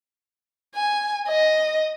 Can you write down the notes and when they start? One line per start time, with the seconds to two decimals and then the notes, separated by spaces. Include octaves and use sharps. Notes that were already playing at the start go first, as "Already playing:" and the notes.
0.74 G#5
1.28 D#5